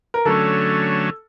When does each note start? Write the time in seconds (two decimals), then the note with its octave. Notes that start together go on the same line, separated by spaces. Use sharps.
0.14 A#4
0.25 D3 F#3 A3 C#4 A4